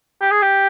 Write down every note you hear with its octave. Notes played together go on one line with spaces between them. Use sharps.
G4
G#4
G4